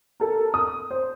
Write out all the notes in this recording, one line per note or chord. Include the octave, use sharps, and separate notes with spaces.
A4 A#4
D#6
C5